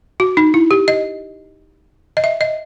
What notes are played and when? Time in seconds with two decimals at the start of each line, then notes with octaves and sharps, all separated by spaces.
0.20 F#4
0.37 D#4
0.54 E4
0.71 G4
0.88 D#5
2.17 D#5
2.24 E5
2.41 D#5